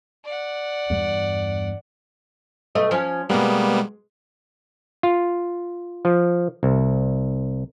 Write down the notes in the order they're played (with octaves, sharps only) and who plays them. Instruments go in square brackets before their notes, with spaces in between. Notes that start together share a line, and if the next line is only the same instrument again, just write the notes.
[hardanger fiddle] D5 F#5
[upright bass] E2 G2
[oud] B2 A3 D#5
F3 C#4
[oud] B2 G#3 [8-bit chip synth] G3 A#3 B3
[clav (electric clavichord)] F4
F3
C2